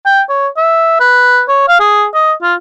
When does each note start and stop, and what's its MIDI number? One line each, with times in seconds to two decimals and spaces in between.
0.06 0.22 79
0.29 0.48 73
0.58 0.97 76
1.00 1.42 71
1.49 1.67 73
1.68 1.79 77
1.80 2.06 68
2.14 2.33 75
2.43 2.55 65